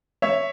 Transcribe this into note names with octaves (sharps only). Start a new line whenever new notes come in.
C#5 E5